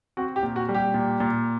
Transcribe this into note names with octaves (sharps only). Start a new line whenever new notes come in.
C4 F#4
G4
A#2
F#4
G3
G4
A#2
A#2